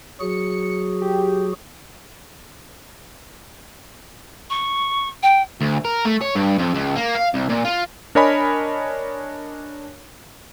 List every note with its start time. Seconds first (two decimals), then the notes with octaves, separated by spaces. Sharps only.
0.20 F#3 F#4 G#4 C#7
1.02 G4
4.50 C#6
5.22 G5
5.61 D2
5.85 A#4
6.05 A3
6.21 C#5
6.35 G2
6.58 F2
6.74 C#2
6.96 A#3
7.15 F5
7.34 C2
7.50 A#2
7.65 F4
8.15 D4 A#4 C#5 D#5 G#5 B5